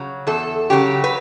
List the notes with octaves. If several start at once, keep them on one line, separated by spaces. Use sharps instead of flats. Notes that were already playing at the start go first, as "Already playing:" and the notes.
Already playing: C#3 F#3
E2 A4
C#3 F#3 G4
B4